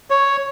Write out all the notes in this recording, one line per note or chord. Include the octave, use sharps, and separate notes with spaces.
C#5